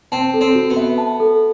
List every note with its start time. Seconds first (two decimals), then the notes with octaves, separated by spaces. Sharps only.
0.12 C4 A5
0.34 A4
0.41 C4
0.55 F#4
0.70 B3
0.77 E5
0.98 A5
1.20 A4